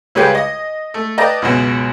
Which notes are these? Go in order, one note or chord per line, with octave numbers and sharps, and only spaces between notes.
C#2 C#3 G3 B4 G5
D#5
A3
B4 D5 D#5 G5 A5 A#5
C#2 F#2 B2